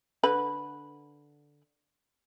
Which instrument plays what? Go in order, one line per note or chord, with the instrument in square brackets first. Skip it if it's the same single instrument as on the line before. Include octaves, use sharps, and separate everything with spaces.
[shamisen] D3 B4 B5